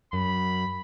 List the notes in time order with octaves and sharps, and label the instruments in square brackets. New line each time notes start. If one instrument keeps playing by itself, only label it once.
[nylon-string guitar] F#2 [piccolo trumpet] B5